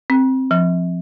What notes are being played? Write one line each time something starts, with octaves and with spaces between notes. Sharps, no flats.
C4
F3